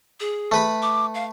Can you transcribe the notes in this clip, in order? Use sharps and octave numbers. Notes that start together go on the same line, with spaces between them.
G#4
A3 B4 B5
D6
F5